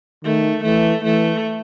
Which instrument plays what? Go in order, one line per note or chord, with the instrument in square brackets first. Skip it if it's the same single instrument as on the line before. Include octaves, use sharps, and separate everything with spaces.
[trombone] D#3 [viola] A3
[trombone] E3 [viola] A3
[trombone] E3 [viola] A3